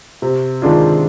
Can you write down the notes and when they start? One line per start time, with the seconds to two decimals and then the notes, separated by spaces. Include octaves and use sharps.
0.22 C3
0.62 D#3 G#3 D4 F4